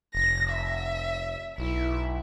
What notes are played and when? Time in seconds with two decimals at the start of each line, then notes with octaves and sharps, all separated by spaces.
0.15 F1 A#6
0.53 E5
1.58 B1 E4 E5